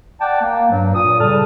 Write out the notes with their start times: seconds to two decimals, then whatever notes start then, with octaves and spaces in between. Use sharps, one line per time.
0.21 D5 F#5 G5 A5
0.41 A#3
0.71 G2 F#3
0.94 A#2 D#6
1.20 C#3 G3 A4 A5 F6